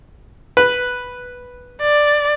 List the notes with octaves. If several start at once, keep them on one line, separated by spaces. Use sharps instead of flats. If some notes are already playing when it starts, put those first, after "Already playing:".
B4
D5